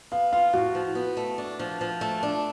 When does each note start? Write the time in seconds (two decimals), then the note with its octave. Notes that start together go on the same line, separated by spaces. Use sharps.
0.11 B3 F5
0.33 F4 F5
0.53 A2 F#4
0.75 F3
0.95 B3
1.17 A3
1.38 D4
1.59 F3
1.81 F3
2.01 A3
2.23 D4